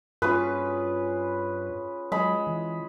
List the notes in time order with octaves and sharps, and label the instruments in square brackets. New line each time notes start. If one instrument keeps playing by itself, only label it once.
[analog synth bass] G2 [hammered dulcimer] C#4 F4 G#4 [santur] B4
[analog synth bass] F#3 [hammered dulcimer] G#3 [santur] B5
[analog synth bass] E3